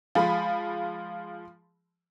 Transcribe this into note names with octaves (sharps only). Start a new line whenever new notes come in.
F3 G#3 F5 B5